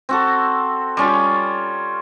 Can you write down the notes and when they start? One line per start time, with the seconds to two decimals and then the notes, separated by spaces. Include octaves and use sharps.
0.09 C4 F#4 A4
0.97 G3 C#4 F4